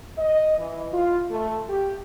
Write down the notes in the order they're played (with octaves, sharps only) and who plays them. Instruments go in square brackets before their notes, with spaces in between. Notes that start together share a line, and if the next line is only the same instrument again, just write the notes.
[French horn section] D#5
E3
F4
A3
G4